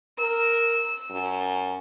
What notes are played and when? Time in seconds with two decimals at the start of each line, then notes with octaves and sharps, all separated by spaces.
0.18 A#4 E6
1.10 F#2